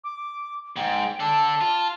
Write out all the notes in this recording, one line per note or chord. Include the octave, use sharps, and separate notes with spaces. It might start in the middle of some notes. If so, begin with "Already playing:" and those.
D6
G#2 G5
D4 A4 A5
F4